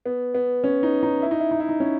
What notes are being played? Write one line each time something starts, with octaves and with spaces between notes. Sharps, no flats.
B3
B3
C#4
D#4
D#4
E4
D#4
E4
D#4
E4
D#4
C#4